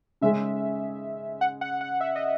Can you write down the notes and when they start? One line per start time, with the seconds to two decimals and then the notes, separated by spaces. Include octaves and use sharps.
0.21 C#3 G#3 C#4 G#4 E5
1.41 F#5
1.61 F#5
1.81 F#5
2.00 E5
2.16 D#5